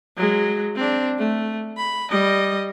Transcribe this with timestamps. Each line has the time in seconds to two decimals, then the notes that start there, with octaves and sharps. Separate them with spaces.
0.17 F#3 G#3
0.76 C4 D4
1.18 A3
1.77 B5
2.10 G3 D#5